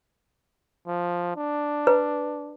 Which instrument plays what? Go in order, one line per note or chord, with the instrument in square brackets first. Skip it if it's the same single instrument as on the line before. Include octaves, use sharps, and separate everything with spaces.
[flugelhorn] F3
D4
[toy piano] B4